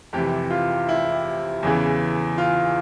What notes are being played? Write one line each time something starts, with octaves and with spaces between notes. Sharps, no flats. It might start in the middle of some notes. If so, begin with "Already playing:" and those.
F2 C3 E3 G4
F4
E4
E2 C#3 E3
F4